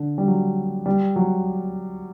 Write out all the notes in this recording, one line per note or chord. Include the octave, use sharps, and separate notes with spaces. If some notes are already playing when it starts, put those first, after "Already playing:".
Already playing: D3
G3
F#3
G3
F#3